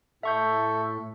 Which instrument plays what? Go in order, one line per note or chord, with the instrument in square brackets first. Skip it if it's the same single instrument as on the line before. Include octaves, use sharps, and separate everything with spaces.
[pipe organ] A2 [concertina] A4 [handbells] E5 C#6 G6